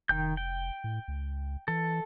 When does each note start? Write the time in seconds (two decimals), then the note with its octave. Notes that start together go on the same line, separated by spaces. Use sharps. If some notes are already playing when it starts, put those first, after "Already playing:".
0.09 F1 D#3 G5 G6
0.37 G5
0.84 A2
1.08 C#2
1.68 E3 A4